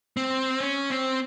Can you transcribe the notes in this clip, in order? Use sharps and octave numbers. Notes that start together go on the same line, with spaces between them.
C4
C#4
C4